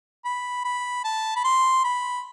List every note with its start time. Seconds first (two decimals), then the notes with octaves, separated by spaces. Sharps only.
0.25 B5
0.65 B5
1.04 A5
1.36 B5
1.44 C6
1.84 B5